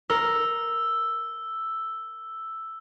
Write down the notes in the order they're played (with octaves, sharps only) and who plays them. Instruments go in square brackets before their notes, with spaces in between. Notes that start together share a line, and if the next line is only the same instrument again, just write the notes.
[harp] A#4 [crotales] E6